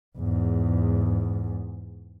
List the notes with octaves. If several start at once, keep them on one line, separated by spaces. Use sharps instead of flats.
E2 G#2